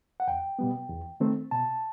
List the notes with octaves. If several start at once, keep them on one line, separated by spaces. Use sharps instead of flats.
F#5
E2 G5
B2 G3 B3
E2
D#3 A3 C4
B2 A5